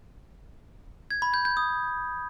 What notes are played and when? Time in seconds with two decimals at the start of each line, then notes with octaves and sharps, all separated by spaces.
1.11 G#6
1.22 B5
1.34 G6
1.45 G6
1.57 D#6